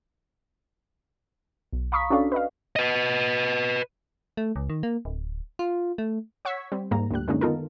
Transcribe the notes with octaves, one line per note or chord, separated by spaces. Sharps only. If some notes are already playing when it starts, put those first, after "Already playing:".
B1
F5 A#5 B5 C#6 D#6 B6
C#4 D4 F#4 A4 D5 F5
B4 D#5 F5
B4 D#5
A3
C#2
D#3
A#3
D1
F4
A3
C#5 F#5 C#6 E6 G#6 B6
G3 C4
D#2 G#2 G3 A#3 A#5
D2 A#2 G3 F#6
F#2 D3 G#3 A#3 C#4 D#4
D#3 B3 D#4 F4 A4 A#4